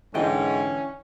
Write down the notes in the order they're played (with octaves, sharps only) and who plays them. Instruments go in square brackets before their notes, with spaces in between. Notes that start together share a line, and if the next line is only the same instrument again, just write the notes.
[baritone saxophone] G#2 [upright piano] D3 E3 [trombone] C#4 [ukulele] D5 D#5 G5